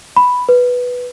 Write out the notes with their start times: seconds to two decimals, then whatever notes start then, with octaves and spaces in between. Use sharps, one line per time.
0.16 B5
0.49 B4